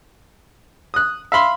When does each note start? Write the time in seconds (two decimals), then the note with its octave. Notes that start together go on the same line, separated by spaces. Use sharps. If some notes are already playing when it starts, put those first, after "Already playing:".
0.94 D#6 F#6
1.32 E5 F5 B5 C6